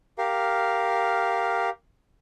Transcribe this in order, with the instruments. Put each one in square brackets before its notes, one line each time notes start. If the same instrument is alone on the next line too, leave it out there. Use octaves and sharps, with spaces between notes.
[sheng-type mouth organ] G4 A#4 F5